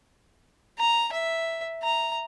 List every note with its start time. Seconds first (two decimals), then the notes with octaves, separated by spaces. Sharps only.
0.79 A#5
1.13 E5
1.83 A#5